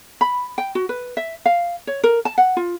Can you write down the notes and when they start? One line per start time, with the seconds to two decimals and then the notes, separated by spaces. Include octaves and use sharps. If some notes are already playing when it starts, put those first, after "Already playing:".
0.21 B5
0.58 G5
0.75 F#4
0.89 B4
1.17 E5
1.46 F5
1.87 C#5
2.04 A#4
2.25 A5
2.38 F#5
2.57 F4